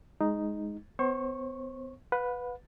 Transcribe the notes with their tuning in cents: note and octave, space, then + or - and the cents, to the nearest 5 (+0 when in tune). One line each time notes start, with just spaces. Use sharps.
G#3 +0 D#4 +0
B3 +40 C5 +35 C#6 -10
B4 +0 F#5 -40